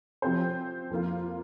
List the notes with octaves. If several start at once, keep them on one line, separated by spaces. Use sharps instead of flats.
F3 C4 G4 C5
F2 F3 A#3 F4